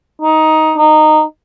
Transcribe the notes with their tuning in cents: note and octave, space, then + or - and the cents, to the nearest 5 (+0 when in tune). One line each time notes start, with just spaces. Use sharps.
D#4 +10
D#4 -15